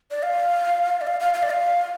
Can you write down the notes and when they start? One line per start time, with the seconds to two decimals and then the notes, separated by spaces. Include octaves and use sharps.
0.11 D5
0.23 F5
1.01 D5
1.07 F5
1.20 F5
1.34 F5
1.43 D5
1.50 F5